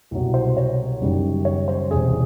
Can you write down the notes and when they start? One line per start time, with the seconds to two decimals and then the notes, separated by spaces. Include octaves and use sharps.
0.11 C2 B2 F#3
0.34 C5
0.57 C#5
1.01 F#1 F#2 D#3 G3
1.45 C#5
1.68 C5
1.91 E1 E2 C3 G#4